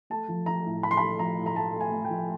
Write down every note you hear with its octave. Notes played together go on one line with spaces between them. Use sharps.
A3 A5
F3
F3 A#5
A2
A2 B5
C6
B5
A3
F3 A#5
A2
A#5
A3 A5
A3
G#5
A3
G5
F3